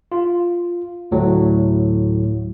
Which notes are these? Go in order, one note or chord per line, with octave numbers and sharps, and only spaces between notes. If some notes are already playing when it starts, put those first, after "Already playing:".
F4
D2 A2 F#3